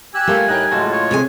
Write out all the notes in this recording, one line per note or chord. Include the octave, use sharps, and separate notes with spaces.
G4 G#5 E6 F#6
G3 A3 A#3 F4
A2 D#4 A#4 G5 F#6
F#1 A2 G#3 F4 F#4 A4
C#5
C3 G#4 G#5